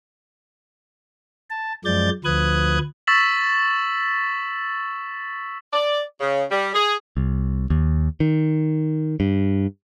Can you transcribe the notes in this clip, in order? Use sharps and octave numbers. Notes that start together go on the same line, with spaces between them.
A5
F#2 F3 G#3 D5 G6 A6
D2 F3 B4 D#6 F#6 G#6
C#6 E6 A6 B6 E7 F#7
D5
C#3
G3
G#4
C2
D#2
D#3
G2